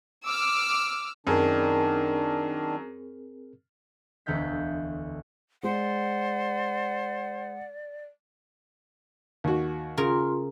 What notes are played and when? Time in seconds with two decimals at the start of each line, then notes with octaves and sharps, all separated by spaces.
0.24 D6 E6 F6
1.27 F#2 D#3 C4 D4 G#4 A#4
4.26 E1 D2 D3 F5 G6 B6
5.63 G#3 C5 D5 F#5
9.44 D#2 F#4
9.98 C#3 F4 A#4 C6